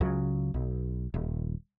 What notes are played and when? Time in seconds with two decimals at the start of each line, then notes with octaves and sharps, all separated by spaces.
0.01 C#2 C#3 F#3
0.54 B1
1.14 D#1